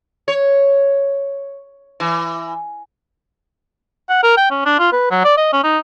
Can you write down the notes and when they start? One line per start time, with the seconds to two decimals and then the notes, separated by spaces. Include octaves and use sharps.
0.28 C#5
2.00 E3
4.10 F#5
4.23 A#4
4.37 G5
4.51 C#4
4.66 D4
4.79 F4
4.93 B4
5.11 F#3
5.24 D5
5.37 D#5
5.53 C#4
5.64 D#4